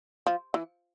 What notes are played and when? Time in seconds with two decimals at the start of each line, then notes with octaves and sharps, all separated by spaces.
0.27 F3
0.54 E3